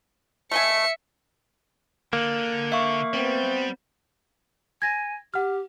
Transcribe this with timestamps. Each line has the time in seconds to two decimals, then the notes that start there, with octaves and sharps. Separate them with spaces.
0.52 A3 D#5 E5 G#5 C#7
2.13 D3 A#3
2.72 E5 F5 C#6
3.14 G3 B3 C4
4.82 G#5 G#6 A#6
5.34 G4 F#5 F6